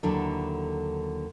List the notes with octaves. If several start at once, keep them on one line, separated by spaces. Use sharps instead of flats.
D#2 D3 F#3 D4 E4 A4